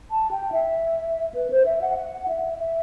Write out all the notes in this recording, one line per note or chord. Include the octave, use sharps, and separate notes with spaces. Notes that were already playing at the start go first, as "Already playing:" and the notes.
A5
G5
E5
B4
C5
E5
F#5
F#5
E5
E5